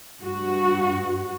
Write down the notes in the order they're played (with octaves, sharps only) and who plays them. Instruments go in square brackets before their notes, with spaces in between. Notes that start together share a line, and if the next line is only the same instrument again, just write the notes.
[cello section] G2 F#4